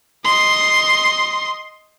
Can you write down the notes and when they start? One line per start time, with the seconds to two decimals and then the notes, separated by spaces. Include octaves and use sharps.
0.25 D#5 C6